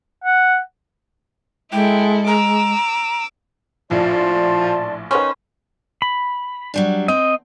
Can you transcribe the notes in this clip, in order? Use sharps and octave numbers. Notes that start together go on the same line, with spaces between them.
F#5
G#3 E4 A4 G5
A#5 D6 E6
A#1 A2 F3 D5 A5 C6
D#3 C#4 B4 C5
B5
F#3 G3 D4
C4 D#5